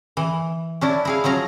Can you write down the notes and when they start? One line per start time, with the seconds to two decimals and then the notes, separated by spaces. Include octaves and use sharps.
0.17 E3
0.81 C#4 D4 E4
1.05 E4 G#4 F5
1.24 F3 F#3 C#4 A#5